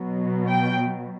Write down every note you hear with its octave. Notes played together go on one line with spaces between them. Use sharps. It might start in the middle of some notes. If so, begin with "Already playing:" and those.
Already playing: B2 F#3
G5